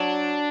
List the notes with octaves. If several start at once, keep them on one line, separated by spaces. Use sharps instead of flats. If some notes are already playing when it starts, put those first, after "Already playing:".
Already playing: F#3 D4